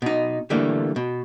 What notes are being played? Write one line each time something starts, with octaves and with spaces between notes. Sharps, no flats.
B2 D#4
D3 E3 G3 A3 A#3
B2